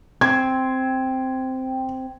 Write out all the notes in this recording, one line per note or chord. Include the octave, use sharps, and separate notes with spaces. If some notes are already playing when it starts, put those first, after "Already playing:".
C4 G#6